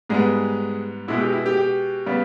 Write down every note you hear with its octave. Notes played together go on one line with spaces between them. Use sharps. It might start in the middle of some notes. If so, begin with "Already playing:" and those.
G#2 G3 G#3 B3 G#4
B2 G#3 B3 E4
G4
E4
G4
G4
C#3 G3 B3